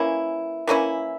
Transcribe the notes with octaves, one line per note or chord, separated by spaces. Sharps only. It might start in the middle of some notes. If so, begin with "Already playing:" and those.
Already playing: E3 A#3 C#4 E4
E3 A#3 C#4 E4